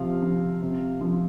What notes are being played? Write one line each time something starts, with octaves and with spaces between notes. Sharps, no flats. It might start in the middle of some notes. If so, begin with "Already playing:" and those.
Already playing: C3 F3 F5
F3
C3
F3